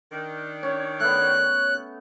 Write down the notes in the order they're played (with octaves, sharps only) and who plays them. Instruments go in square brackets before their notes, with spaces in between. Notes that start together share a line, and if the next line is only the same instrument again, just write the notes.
[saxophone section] D#3 D4
[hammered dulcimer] C#4 [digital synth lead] C#5
[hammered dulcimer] A3 B3 [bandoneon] F#6